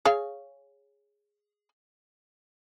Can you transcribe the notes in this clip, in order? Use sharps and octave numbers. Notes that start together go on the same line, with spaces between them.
G#4 C#5 F5